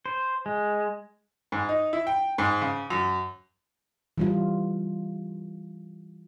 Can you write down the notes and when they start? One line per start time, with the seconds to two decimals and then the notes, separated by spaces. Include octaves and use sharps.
0.06 C5
0.46 G#3
1.52 G#2
1.69 D#4
1.93 E4
2.07 G5
2.38 G#2
2.62 C#3
2.90 F#2
4.18 E3 G3 F4